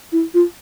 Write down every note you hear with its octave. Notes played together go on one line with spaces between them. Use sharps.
E4
F4